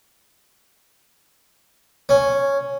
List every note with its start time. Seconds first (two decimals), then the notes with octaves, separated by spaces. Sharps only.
2.09 C#4